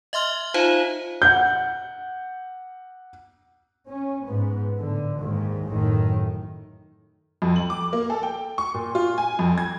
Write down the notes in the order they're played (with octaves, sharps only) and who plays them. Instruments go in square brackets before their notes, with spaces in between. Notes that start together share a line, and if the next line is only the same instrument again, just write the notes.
[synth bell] D#5 E5 C6 F6
D#4 F4 C5 F5 A5
[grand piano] F#5 G6
[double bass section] C#4
G#2 B3
A2 D3
D#2 G#2 D#3
A1 F#2 A2 D#3
[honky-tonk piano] F2
F#7
D6
A#3
A4
G5
C#6
A#2
F4
G#5
F2
G#6